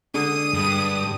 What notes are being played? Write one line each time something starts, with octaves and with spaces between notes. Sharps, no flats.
D3 G#3 D4 D#6 D#7
G2